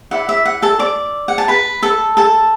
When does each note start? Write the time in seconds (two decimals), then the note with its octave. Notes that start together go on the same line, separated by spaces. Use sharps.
0.11 E4 D5 F#5
0.29 E5
0.45 F#5
0.62 A4 A5
0.79 D5 D6
1.28 F#5
1.38 A5
1.48 B4 B5
1.83 A4 A5
2.17 A4 A5